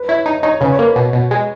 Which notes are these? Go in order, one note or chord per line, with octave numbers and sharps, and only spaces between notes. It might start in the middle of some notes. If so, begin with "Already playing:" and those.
Already playing: B4
E4 C#5
D#4 D#5
D#4 C#5
C#3 B4
C#5
A#3
B4
B2
B2
G#3